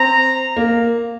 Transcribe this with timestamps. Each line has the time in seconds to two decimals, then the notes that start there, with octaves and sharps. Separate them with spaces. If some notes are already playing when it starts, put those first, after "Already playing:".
Already playing: C4 A#5
0.57 A#3